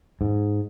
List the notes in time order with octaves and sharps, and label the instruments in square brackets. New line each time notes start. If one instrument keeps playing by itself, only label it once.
[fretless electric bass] G#2